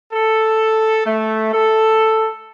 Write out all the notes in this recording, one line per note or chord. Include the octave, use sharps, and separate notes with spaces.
A4
A3
A4